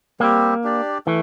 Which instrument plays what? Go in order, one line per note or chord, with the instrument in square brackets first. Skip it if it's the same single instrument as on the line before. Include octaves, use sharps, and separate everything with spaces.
[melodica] G3 C4 G4 [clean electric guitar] A#3
[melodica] D4 G4 D5
[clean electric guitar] E3 [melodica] A3